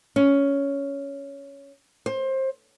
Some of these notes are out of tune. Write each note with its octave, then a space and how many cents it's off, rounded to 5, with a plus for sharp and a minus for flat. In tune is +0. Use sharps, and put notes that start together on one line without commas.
C#4 +10
C5 +25